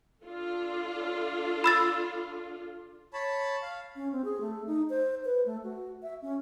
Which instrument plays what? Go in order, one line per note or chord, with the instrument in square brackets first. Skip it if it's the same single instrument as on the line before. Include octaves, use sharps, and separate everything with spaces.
[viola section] D4 F4 A4
[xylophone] B5 E6 A6
[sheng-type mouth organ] C#5 A5 B5
F5
[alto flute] C#4
C4
G#4
A3
D#4
C5
B4
A3
F#4
E5
C#4